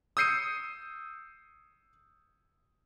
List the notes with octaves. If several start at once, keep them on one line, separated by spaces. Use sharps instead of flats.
D#6 E6 G6 C7 C#7 D#7